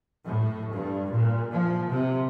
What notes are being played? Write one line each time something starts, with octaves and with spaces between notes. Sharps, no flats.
A2
G2
A#2
F3
C3